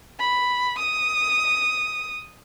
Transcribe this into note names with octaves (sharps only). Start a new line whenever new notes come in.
B5
D#6